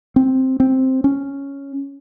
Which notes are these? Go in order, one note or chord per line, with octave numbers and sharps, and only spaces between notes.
C4
C4
C#4